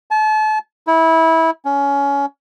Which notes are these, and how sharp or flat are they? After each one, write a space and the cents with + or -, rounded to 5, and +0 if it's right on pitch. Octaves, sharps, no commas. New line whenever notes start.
A5 -35
E4 -20
C#4 +20